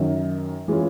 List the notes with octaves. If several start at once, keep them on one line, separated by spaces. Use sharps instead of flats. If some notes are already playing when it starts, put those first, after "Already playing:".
Already playing: F#2 D#3 F#3
E3 G#3 C#4 F4